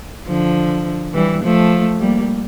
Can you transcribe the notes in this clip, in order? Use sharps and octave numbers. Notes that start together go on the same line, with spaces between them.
D3 F3
E3 G3
F3 A3
G3 A#3